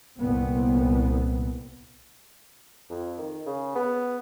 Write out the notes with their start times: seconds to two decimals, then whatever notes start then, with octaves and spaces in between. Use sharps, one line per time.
0.19 C2 A#2 B3 C4
2.90 F2
3.18 D#3
3.46 C#3
3.75 B3